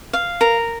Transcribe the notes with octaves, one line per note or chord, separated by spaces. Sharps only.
F5
A#4